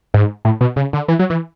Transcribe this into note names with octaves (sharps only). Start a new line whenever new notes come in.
G#2
A2
B2
C#3
D3
E3
F#3
E3